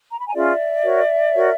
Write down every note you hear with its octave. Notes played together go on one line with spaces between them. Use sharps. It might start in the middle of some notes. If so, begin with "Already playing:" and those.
A#5
B5
G#5 A#5
C#4 F4 G#4 D5 E5
F#4 A#4 C#5
F#4 A#4 C#5